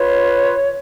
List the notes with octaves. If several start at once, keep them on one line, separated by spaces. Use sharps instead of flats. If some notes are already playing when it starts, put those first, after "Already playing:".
Already playing: F4 B4 C#5